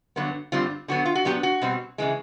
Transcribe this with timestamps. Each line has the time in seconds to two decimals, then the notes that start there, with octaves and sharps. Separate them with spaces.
0.16 G2 D3 F#3 B3
0.52 G2 D3 G3 C4 F4
0.88 D3 F#3 B3 F#4
1.05 F4
1.15 F#4
1.25 A#2 F#3 B3 D4 G4
1.43 F#4
1.62 B2 G3 C4
1.98 C#3 E3 G#3